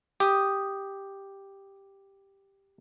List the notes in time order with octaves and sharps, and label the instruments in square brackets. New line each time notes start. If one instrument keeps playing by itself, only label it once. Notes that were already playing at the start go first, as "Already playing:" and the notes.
[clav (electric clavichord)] G4 [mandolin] D#6